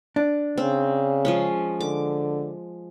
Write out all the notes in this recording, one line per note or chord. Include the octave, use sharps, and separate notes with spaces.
D4
C#3 C4
F3 G#3 C#4
D3 D6